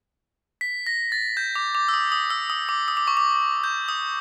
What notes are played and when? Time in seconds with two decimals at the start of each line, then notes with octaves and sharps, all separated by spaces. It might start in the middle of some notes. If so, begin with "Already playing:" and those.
0.61 B6
0.87 A#6
1.12 A6
1.37 G6
1.56 D6
1.75 D6
1.88 E6
1.94 D#6
2.12 D#6
2.30 E6
2.50 D#6
2.69 D6
2.88 D#6
2.97 D6
3.07 C#6
3.17 D6
3.64 G6
3.88 D#6